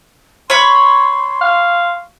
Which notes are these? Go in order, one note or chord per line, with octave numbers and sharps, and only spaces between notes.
C#5 B5 C6
F5